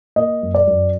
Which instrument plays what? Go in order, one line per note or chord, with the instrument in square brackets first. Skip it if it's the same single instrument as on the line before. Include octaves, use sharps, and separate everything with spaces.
[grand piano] A#3 D#5
F#2
D5
F#2